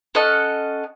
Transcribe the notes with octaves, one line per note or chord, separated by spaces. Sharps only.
C#4 A4 D#5 F#5